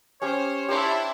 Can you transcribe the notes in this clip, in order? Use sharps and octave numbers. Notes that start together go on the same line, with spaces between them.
C#4 G4 C5 C#5
D4 E4 G4 C5 C6